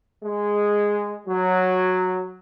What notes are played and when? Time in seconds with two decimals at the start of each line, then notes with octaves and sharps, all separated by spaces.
0.23 G#3
1.27 F#3